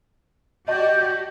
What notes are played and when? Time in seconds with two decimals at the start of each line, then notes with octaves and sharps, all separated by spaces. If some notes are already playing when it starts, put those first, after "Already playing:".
0.68 F#4 G4 D5 D#5 A5 G6